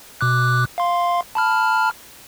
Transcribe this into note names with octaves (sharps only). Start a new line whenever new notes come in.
B2 D6 F#6
F5 C6
A5 B5 F6